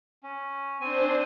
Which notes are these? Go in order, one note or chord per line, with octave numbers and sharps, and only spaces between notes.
C#4
C4 D4 C5 G#5